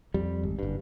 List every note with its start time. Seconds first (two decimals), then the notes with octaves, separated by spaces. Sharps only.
0.14 F2 G3
0.43 G#1
0.59 F#1 G2